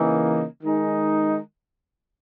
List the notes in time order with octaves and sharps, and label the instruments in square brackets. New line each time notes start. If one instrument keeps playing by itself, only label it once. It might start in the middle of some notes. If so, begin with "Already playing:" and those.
Already playing: [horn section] C#3 E3 A#3 D#4
D#3 G#3 D#4